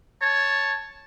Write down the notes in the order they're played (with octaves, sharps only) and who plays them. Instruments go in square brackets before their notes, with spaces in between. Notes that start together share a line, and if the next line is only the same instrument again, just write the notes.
[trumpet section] C#5 A5